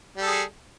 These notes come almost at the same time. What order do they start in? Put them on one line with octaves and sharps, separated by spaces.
G3 A4 G#4